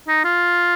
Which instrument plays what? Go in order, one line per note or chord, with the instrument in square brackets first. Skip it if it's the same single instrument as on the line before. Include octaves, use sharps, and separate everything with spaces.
[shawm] D#4
F4